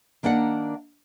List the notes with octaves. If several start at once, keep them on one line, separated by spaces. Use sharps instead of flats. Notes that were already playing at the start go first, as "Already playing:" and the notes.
D#3 A#3 D4 D5 F#5